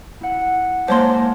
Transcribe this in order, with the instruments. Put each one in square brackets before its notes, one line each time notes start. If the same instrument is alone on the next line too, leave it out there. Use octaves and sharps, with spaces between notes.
[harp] E4 F#5
[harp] G#3 A#3 A#4 [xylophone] C5 C#5 C6 [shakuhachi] A5